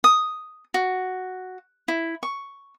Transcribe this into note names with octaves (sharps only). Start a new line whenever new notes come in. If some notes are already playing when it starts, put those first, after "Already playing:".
D#6
F#4
E4
C#6